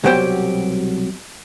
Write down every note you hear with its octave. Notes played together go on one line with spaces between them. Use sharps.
C2 B2 F#3 G4 C5 G5